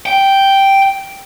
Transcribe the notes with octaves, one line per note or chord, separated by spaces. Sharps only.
G5